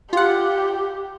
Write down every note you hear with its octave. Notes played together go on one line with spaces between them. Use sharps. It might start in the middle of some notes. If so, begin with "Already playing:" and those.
F4 G4 F#5